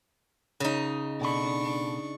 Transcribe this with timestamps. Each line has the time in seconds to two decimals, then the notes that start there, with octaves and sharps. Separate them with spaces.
0.60 C#3 D#4
1.20 B2 D4 A4 B5 C#6